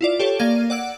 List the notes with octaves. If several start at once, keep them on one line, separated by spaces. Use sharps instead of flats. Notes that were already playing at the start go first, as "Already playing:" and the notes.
E4 F4 D5
G4 A4 C#5
A#3 D5 F5 G#6 D#7
D5 F#5 E6 D7